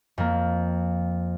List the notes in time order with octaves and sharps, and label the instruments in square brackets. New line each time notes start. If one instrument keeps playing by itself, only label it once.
[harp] F2 A#3